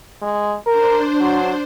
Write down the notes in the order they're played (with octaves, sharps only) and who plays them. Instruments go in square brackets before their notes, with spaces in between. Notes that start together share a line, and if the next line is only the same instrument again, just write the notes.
[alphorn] G#3
[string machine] D4 C5 [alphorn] A#4
[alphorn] F#3